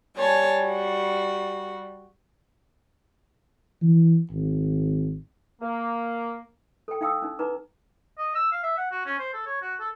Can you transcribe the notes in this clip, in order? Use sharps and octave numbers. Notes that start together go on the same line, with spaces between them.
G3 C#5 G#5 A5
F#4
E3
G#1
A#3
A4 G5
D#4 F5 G5 D#6 E6
C#4 D#4
D#4 B4 A#5 D6
D#5
E6
F5
E5
F#5
F#4
C#4
C5
A4
C#5
F#4
A4